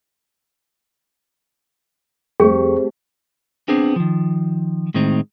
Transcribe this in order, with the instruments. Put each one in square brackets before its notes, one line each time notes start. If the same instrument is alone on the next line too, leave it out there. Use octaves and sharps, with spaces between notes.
[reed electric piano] F2 G4 C#6 [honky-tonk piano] G3 A3 [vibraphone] C4 C5 [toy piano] G#4
[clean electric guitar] B3 C4 D4 G#4 C5
D#3 F3
A2 D#3 G#3 C4 D#4